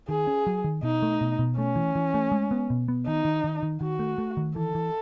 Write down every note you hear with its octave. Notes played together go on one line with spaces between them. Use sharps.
D#3 G#4
C#4
F#3
D#3
B2 D#4
A3
B2
B2
A3 C#4
E3
E3
A3
G#3
B3
B2
B3
D#3 D#4
D#3
D#3
D#3
D#3 F#4
A3
A3
D#3
E3 A4
E3